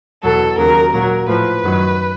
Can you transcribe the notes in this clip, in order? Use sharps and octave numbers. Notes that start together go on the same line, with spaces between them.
E2 B2 F#3 A4
D#2 C#3 F#3 A#4
A#2 F#3 A#4
A2 F3 B4
F#2 D#3 F#3